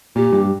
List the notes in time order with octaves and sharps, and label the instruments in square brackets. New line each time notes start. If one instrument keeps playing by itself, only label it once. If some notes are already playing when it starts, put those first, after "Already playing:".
[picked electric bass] A#2 [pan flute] G4
[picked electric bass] G2